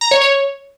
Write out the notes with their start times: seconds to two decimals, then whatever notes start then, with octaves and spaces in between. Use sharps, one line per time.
0.01 A#5
0.11 C#5
0.22 C#5